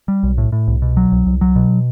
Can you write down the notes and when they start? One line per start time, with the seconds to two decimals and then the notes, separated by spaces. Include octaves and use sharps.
0.08 G3
0.23 B1
0.38 A2
0.52 A2
0.68 C2
0.82 B2
0.97 F#3
1.12 C2
1.26 C2
1.41 F#3
1.56 B2